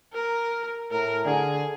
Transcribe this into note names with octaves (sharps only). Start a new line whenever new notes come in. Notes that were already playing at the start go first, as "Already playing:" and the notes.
A#4
A2 A#4
D3 G#4